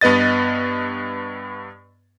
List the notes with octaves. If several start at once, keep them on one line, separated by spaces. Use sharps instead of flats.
G2 B3 B4 D#5 A6